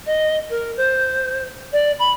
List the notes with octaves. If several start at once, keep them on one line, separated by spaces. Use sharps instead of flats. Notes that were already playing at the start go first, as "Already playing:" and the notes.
D#5
A#4
C5
D5
B5